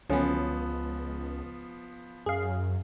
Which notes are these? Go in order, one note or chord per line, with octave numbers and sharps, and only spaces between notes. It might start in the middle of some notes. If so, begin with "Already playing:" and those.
C#2 D3 F3 F#3 B3 C#4
F#2 G#4 F5